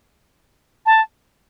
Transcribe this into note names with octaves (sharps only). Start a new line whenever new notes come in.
A5